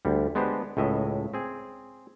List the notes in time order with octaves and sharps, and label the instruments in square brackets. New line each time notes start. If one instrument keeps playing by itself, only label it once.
[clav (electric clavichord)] D2 G3
G#3 B3 D4 G4 B4 C5
C#2 A2 D#5 E5
C4 G#4